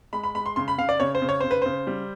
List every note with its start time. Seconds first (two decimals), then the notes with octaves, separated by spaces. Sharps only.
0.13 G#3 B5
0.23 B5
0.35 G#3 B5
0.46 C6
0.56 C#3 C6
0.68 B5
0.78 C#3 F5
0.89 D5
1.00 C#3 C#5
1.15 C5
1.22 C#3
1.29 C#5
1.41 C#3 C5
1.51 B4
1.62 C#3 C5
1.87 G3